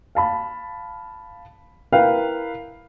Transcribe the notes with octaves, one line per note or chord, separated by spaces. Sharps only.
F5 A5 B5
E4 A#4 B4 F5 G5